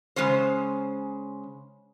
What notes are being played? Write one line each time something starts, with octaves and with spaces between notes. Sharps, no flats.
C#3 G#3 C#4 C5